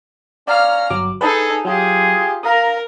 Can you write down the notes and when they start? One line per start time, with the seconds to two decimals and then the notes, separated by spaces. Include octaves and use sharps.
0.47 C#4 D5 F5 A#5 F6
0.90 G1 F#3 D6
1.21 D#4 G#4 A4 B4 A5
1.65 F#3 F4 G4 G#4
2.43 A#4 F5 A#5 D#6